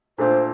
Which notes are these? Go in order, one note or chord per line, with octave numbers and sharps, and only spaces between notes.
A#2 A3 D4 F4 C5